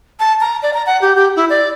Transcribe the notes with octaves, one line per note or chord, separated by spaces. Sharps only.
A5
A#5
D5
A#5
F#5
G4
G4
E4
D5